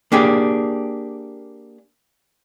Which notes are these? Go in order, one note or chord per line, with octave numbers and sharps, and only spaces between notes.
A#3 D4 G4 G#4